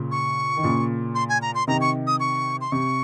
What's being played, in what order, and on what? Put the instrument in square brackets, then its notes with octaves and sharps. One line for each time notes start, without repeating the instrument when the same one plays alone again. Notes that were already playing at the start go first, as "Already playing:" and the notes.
Already playing: [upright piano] A#2 C#3
[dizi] C#6
[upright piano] D#3
A#2 C#3
[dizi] C6
G#5
A#5
C6
[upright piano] C3 D#3 [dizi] A#5
[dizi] C#6
D#6
C#6
C6
[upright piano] C3 [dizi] C#6